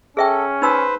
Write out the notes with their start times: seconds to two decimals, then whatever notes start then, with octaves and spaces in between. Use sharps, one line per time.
0.17 C#4 G#4 A4 E5 G5
0.62 D#4 B4 C5 E6